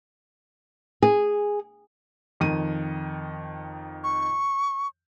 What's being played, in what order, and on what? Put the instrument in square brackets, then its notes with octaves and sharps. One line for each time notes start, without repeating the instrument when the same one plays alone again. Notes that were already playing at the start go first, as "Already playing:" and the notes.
[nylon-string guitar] G#4
[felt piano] F2 D#3 D#7
[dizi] C#6